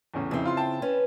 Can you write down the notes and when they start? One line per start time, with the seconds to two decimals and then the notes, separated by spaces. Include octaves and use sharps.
0.14 E2 A2 C#3
0.31 F2 C#3 C4 E4
0.45 F4 C6
0.57 G5 A5
0.82 C#4 B4